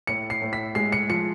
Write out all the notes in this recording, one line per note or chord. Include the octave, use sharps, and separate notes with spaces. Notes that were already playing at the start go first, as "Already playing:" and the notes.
A2 C#7
C7
A2
B6
G#3 C7
C#7
F3 C#7